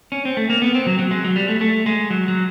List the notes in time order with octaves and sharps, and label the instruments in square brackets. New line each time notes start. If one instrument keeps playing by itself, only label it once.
[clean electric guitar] C#4
C4
A3
A#3
B3
C4
F#3
F#3
G#3
F#3
G3
A3
A3
G#3
F#3
F#3